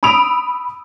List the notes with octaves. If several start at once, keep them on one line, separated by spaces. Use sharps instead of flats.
B5 D#6 E6 D7 F7